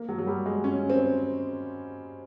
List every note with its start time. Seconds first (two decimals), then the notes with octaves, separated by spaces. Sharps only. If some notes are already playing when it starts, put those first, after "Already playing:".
Already playing: A#3
0.09 F#3
0.19 F#3
0.27 G3
0.46 G#3
0.64 C#4
0.90 C4